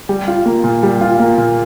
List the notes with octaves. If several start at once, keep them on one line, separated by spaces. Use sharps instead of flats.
G3
F4
A#3
A#2
G3
F4
A#3
A#2